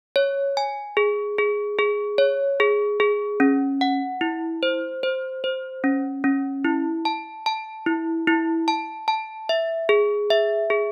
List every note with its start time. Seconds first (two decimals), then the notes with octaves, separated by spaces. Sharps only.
0.16 C#5
0.57 G#5
0.97 G#4
1.38 G#4
1.79 G#4
2.18 C#5
2.60 G#4
3.00 G#4
3.40 C#4
3.81 F#5
4.21 E4
4.63 C5
5.03 C5
5.44 C5
5.84 C#4
6.24 C#4
6.64 E4
7.05 A5
7.46 A5
7.86 E4
8.27 E4
8.68 A5
9.08 A5
9.49 E5
9.89 G#4
10.30 E5
10.70 G#4